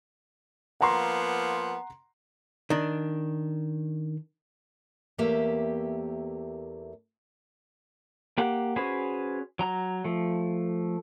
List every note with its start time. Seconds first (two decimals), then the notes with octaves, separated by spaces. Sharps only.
0.81 F3 A#3 B3 F#5 A#5 C6
2.70 D#3 D4
5.18 E2 A3 A#3 G4 E5
8.38 A#3 G4 F#5
8.76 C#4 F#4 G#4 B4 C5
9.59 F#3 A#5
10.04 F3 A3